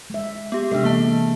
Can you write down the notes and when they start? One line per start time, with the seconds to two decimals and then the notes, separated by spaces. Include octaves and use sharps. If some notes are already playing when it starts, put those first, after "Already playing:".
0.10 G#3 E5
0.52 B3 G4
0.71 C3 G#3 D4 A4 E5
0.84 E3 G#3 A#3 E5 A5